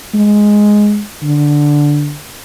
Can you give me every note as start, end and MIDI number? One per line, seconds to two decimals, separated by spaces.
0.14 1.03 56
1.23 2.17 50